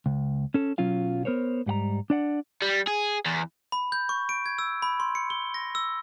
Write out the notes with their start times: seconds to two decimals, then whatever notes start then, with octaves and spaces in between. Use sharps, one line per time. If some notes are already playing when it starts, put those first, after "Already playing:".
0.06 C#2
0.54 C#4 A4
0.78 B1 F#3 C#4 F4 F5
1.25 B3 A#4 C5 C#5
1.66 G#2 G3 F#5 A#5
2.10 D4 D5 F#5
2.62 G3
2.87 G#4
3.26 E2
3.72 B5
3.92 G6
4.09 C#6
4.29 D7
4.46 G#6
4.59 E6
4.82 B5
5.00 C6
5.15 C#7
5.30 G7
5.54 A#6
5.75 E6